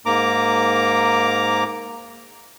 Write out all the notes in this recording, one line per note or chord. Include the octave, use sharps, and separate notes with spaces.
G#2 A#3 A#5 D6